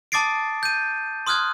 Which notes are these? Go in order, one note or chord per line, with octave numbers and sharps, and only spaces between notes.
A5 D6 D#6 A6 C7 D7
G6 D#7
C6 D#6 F6 F#6 G#6